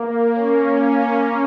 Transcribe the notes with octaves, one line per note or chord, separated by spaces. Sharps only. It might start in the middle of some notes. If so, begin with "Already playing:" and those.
Already playing: A#3
C#4